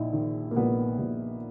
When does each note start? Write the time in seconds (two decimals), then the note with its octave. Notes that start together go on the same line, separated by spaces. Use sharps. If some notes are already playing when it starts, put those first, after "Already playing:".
Already playing: A#1 D#4 E4
0.13 D#3
0.51 A#3
0.56 A#1 B3
0.99 A#1